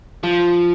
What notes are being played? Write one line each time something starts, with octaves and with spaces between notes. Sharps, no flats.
F3